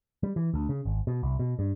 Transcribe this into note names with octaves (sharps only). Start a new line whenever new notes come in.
G3
E3
D2
C#3
G#1
B2
C2
B2
G2